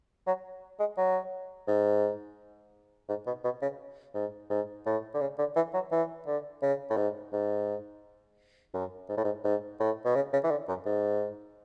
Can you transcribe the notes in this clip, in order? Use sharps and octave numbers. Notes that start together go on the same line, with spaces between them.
F#3
G#3
F#3
G#2
G#2
B2
B2
C#3
G#2
G#2
A2
D3
C#3
D3
E3
F#3
E3
D3
C#3
A2
G#2
G#2
F#2
G#2
A2
G#2
G#2
A2
B2
C#3
C#3
E3
D3
F#2
G#2